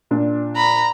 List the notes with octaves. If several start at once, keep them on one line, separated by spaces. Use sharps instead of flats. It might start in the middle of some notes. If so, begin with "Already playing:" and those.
A#2 D4
A#5 B5